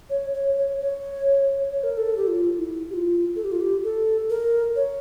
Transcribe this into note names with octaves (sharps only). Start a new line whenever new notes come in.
C#5
C#5
C#5
C#5
C#5
A#4
A4
G4
F4
E4
G4
F4
A4
G4
F4
G4
A4
A#4
C#5